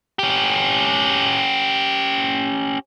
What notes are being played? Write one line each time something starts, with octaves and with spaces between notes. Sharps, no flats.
C#4 G4